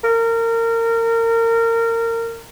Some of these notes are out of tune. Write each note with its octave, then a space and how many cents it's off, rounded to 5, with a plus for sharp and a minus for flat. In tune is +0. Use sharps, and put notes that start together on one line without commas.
A#4 -25